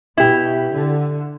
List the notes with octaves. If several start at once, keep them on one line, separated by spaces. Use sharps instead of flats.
B2 E4 G4
D3